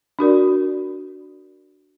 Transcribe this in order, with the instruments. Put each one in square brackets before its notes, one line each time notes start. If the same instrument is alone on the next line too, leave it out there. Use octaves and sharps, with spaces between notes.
[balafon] D4 F#4 A#4 D5